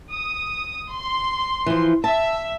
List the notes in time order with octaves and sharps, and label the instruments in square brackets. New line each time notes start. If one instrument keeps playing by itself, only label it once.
[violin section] D#6
C6
[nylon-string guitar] E3 F3
[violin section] E5 [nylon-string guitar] A5